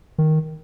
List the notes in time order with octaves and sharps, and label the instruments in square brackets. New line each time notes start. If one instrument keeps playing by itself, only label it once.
[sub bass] D#3